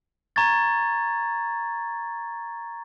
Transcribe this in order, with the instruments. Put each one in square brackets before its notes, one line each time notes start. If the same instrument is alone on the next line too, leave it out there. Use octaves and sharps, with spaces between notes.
[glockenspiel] A#5 C#6 G#6 A6